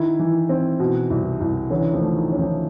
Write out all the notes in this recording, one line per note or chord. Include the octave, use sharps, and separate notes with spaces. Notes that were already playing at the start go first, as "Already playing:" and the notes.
Already playing: D#3 E4
E3
C4
B2
C2
C2
D3 E3 C#4
D#3 F3
A3
D#3
C#4
D#3 F3